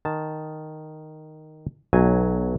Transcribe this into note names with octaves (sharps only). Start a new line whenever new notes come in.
D#3 A5
B1 F#3 G#5